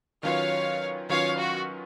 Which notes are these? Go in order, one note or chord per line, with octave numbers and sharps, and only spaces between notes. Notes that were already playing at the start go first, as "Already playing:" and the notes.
D#3 F#3 C#4 F4 B4 C#5 F5
D#3 F#3 C#4 F4 B4 C#5 F5
F#4